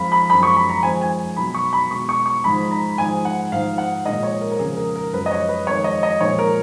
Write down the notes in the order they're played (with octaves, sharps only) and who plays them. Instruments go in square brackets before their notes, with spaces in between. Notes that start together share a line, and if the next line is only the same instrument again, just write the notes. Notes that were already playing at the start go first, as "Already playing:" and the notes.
Already playing: [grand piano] F2 F3 G#3 F5 B5
B5
F#2 F3 G#3 B5
C#6
B5
A#5
F2 F3 G#3 G#5
G#5
B2 F#3 B5
C#6
B5
B2 G#3 C#6
C#6
C#6
G#2 F3 G#3 B5
A#5
G#2 F3 G#3 G#5
F#5
G#2 F3 G#3 F5
F#5
A#2 F3 G#3 D#5
C#5
A#4
A#4
F2 C#3 G#3 G#4
A#4
A#4
F#2 F3 G#3 B4
D#5
C#5
B4
F2 D#3 G#3 C#5
D#5
D#5
A#2 F3 G#3 C#5
A#4